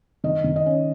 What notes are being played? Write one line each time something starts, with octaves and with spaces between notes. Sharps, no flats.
D#3 D#5
D#3
D#5
C#4